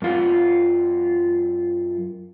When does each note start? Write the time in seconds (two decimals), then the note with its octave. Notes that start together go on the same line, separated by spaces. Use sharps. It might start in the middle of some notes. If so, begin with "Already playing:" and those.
0.02 F#2 F4 F#5